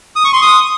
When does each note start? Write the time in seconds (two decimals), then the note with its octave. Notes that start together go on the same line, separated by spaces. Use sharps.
0.16 D#6
0.25 C#6
0.33 C6
0.42 D#6